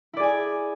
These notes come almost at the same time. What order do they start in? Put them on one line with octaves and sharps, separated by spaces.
E4 D5 G#4 G#5